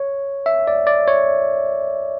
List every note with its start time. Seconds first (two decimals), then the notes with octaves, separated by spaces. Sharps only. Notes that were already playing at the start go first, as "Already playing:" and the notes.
Already playing: C#5
0.46 E5
0.67 D5
0.87 D5
1.08 C#5